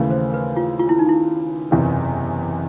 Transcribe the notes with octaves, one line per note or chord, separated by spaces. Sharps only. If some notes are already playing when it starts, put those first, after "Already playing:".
Already playing: D#2 C#3 E3 A3
C5
B4
F4
F4
E4
D#4
E4
F#1 E2 C3 E3